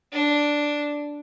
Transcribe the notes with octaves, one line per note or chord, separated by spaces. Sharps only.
D4